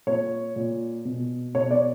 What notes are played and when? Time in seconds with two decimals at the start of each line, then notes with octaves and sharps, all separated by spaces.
0.07 A#2 C#5
0.56 A#2
1.05 B2
1.55 B2 C#5
1.71 D5